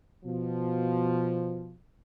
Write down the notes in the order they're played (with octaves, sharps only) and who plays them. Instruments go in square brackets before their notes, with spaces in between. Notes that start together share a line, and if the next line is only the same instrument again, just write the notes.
[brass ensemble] B2 F3